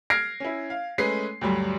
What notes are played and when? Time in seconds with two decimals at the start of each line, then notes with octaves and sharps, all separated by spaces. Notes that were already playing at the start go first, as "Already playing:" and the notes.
0.10 F6 G#6 A#6 C7 D7
0.40 C#4 E4
0.70 F5
0.98 G#3 A3 C#4 G#4 B4 C7
1.41 D2 G2 F#3 G3